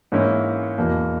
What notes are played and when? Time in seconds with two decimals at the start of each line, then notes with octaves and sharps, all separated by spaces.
0.12 G#2 E3 A#3 C#4 E4
0.78 E2 B2 A#3